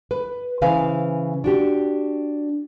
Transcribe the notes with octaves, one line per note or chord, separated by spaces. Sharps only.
B4
C#3 E3 B4 C5 F5 G#5
D4 F#4 G4